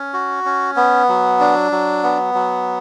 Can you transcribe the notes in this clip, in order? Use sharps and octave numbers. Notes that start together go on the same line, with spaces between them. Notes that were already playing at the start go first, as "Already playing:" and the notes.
Already playing: C#4
F#4
C#4
B3
F#3
D4
F#3
B3
F#3